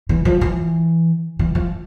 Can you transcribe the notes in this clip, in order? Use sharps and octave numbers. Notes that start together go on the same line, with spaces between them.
E3
F3
E3
E3
F3